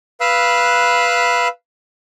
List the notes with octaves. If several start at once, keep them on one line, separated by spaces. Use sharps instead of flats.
B4 F5 B5 E6 F#6